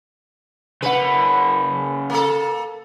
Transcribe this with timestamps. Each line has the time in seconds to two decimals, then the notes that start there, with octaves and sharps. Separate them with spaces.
0.82 C#3 B4 F#5
2.10 A#3 A4